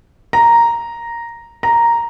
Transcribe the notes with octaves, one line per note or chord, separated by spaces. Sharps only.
A#5
A#5